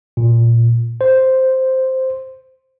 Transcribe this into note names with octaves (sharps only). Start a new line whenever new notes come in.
A#2
C5